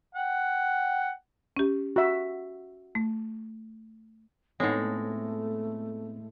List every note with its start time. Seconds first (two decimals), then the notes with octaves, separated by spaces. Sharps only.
0.15 F#5 G5
1.57 C#4 G4
1.96 F#4 E5
2.95 A3
4.60 A2 G#3 B3 C4 D#4 A4 C#5 F#5
4.75 A3